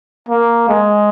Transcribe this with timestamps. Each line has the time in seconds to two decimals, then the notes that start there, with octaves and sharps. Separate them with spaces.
0.29 A#3
0.69 G#3